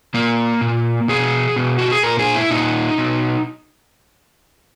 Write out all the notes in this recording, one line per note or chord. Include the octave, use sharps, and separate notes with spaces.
A#2 A#3
A#2
B2 G#4
B2
F#4
G#4
A#2 A#4
G#4
E4
A#2 D#4
B2